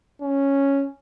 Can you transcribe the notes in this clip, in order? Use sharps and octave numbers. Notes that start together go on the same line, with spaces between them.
C#4